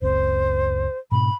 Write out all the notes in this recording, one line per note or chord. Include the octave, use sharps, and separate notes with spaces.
F#1 C#2 C4 C5
G#2 B2 D4 B5